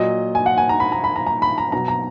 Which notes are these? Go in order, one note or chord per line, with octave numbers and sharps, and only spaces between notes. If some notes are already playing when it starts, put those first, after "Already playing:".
Already playing: A#2 F#3 D#5
G#5
F#5
G#5
A#5
B5
A#5
B5
A#5
A#5
B5
A#5
B2 F#3 A#5
A#5